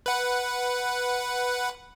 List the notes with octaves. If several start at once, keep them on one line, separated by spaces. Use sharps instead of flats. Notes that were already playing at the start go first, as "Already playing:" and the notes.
B4 F#5